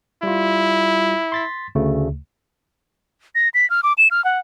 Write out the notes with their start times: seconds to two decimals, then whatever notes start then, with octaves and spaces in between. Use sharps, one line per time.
0.23 G3 E4 F4
1.32 C6 A6 B6
1.75 D2 C#3 A3
3.35 A#6
3.54 B6
3.70 F6
3.83 D6
3.98 E7
4.11 F6
4.25 F#5